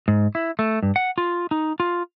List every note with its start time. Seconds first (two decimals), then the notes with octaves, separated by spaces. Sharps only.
0.08 G#2
0.35 E4
0.59 A3
0.83 G2
0.96 F#5
1.18 F4
1.51 D#4
1.80 F4